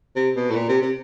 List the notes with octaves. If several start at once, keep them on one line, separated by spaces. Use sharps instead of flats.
C3
B2
A2
A#2
C3
C3